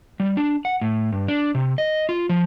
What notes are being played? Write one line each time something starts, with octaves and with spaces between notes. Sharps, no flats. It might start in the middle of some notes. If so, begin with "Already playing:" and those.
G3
D4
F#5
A2
G2
D4
C3
D#5
F4
F3